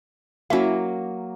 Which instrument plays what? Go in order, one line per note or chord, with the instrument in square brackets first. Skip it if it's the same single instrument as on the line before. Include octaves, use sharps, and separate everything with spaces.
[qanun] F#3 A#3 [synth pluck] C#4 E4 E5